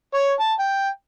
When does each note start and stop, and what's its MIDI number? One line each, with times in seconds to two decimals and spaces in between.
0.14 0.32 73
0.40 0.54 81
0.59 0.89 79